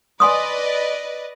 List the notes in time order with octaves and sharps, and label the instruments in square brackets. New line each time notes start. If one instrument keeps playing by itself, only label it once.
[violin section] B4 D5 D#5 [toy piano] G#5 C6 D#6